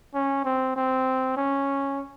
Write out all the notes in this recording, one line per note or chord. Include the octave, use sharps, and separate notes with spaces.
C#4
C4
C4
C#4